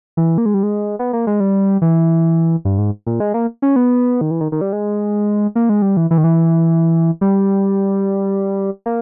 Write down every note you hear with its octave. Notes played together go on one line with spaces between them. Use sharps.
E3
A#3
G#3
G3
G#3
B3
A#3
G#3
G3
E3
G2
G#2
A#2
G#3
A#3
C#4
B3
D#3
E3
D#3
D#3
G3
G#3
A#3
G#3
G3
E3
E3
D#3
E3
G3
A#3